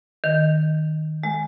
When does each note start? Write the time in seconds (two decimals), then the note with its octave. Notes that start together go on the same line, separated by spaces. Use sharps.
0.24 D#3
1.23 G#3